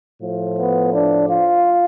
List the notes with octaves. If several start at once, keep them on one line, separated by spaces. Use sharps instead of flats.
A2 F3
B3
D4
F4